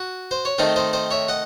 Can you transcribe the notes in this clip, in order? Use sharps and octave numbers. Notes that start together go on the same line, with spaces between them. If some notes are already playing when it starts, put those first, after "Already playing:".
Already playing: F#4
C5
C#5
D#3 A3 C4 D#4 C5 D#5
C5 D#5
C5 D#5
C#5 E5
D#5 F#5